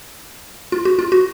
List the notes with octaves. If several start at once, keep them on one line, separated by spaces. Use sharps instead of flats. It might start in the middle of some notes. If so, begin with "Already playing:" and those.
F4
F#4
F4
F#4